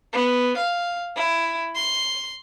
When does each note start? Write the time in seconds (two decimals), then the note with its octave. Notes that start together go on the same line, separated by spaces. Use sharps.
0.14 B3
0.57 F5
1.16 E4
1.76 C6